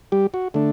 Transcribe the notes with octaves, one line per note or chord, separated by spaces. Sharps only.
G3 G4
F#4
D3 A3 D4